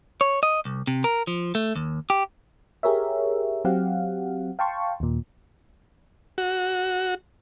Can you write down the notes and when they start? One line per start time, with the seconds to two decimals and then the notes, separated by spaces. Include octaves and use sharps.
0.21 C#5
0.43 D#5
0.65 C2
0.87 C3
1.04 A#4
1.27 F3
1.55 A3
1.76 D#2
2.10 G4
2.83 G4 G#4 A#4 C#5 E5
3.65 F#3 C4 G4 F5 F#5
4.59 F5 G5 A5 C6 C#6
5.00 D#2 A#2
6.38 F#4